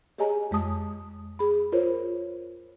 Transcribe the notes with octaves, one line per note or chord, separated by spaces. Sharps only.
G4 G#4 C#5 D#5 G#5 A#5
F2 G#3 A5 D#6
G#4 B5
F4 A#4 C5 C#5